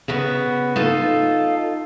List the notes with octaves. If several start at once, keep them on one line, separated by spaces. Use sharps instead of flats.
C#3 B3 F#4
D#4 F4 A4